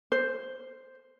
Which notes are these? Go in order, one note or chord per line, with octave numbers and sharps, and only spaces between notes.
C5